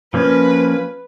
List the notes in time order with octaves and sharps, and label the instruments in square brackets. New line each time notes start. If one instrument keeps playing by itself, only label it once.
[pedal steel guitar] F3 A#3 C#4 [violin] B4